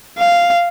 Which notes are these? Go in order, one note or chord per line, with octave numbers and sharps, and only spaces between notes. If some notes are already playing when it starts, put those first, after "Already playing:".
F5